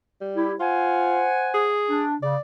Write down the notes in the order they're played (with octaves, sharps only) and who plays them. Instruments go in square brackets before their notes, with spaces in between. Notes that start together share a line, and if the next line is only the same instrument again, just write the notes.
[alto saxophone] G3
[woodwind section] E4 G4
[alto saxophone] F4 [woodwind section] C5 F#5 G#5
[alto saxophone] G#4
[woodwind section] D4
[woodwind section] C#3 [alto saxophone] D5